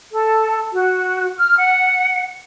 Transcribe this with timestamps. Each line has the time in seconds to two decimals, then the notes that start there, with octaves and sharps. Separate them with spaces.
0.13 A4
0.73 F#4
1.37 F6
1.58 F#5